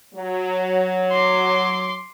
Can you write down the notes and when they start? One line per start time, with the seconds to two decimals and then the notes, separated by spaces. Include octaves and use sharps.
0.15 F#3
1.11 C6 D6